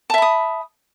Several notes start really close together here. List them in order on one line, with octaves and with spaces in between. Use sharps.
A5 E5 B5 D#6